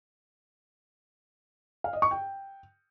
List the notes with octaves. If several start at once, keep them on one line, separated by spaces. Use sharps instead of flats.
F5
D#5
C#6
G5